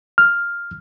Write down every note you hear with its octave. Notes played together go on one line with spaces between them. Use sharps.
F6